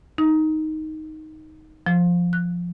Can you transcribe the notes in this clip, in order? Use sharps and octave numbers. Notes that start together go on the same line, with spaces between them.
D#4
F3
F#6